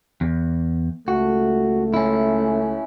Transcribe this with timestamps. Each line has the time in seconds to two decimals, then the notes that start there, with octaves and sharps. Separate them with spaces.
0.21 E2
1.08 C#2 A3 F#4
1.94 C#4 E4